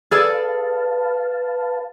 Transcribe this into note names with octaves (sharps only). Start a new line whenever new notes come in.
G#4 A4 B4 D5 F5 A5